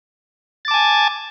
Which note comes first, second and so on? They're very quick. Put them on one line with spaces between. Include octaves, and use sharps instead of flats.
A6 D6 A5 G#5